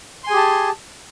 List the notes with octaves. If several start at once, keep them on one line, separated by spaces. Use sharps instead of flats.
G4 G#4 G#5 A5 C6